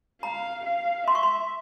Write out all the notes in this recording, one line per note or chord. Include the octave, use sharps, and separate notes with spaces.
F5 A#5
F5
E5 C6
C#6
C6